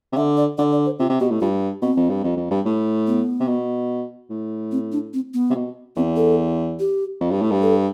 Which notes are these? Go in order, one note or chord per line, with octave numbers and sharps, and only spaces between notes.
C3
D3 E5
D5
D3 D5
D5
C5
C3 F4
C3
B2 G4
A2
G2 F4
B2 C4
F2
G2
F2
F2
G2
A2
B3
C3
B2
A2
C4
D4
C4
B3
C3
B2
E2 C4
A4
G4
F2
G2
A2
G2
A4